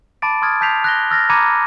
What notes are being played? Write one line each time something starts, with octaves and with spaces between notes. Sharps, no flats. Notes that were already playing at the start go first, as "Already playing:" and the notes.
A5 B5 D6 A6 D7
C6 D#6 F6 G#6 A6
A5 G6 B6 C7 F7
F#6 A#6 G7
E6 F6 A6 A#6
A#5 B5 D6 G#6 C#7 D#7